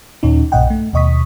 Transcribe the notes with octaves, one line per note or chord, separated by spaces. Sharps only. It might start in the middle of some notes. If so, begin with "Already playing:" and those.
D#2 A#2 C#4 D#4
B1 G2 A#2 D#5 F#5 G5
A3
D#2 B2 D#5 C#6 D#6 B6